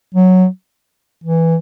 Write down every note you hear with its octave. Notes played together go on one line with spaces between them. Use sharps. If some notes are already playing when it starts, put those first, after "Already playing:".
F#3
E3